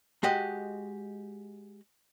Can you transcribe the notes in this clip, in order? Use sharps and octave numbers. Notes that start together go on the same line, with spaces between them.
G#3 F#4 G4 D#5